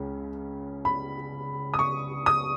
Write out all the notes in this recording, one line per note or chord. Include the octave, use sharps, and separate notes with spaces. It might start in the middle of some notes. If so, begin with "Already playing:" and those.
Already playing: C#2 C#3
B5
D#6
C#6
D#6